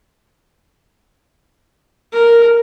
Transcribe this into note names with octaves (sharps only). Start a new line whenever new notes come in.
A#4